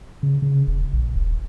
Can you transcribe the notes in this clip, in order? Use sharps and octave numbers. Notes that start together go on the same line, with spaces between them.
C#3
C#3
E1
A#1
D#1